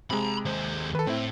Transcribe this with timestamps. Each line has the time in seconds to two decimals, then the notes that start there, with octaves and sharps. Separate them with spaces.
0.11 C3 G#3 A#5 B5
0.45 D#2 C5
0.95 A4 B4
1.07 A2 C4 E4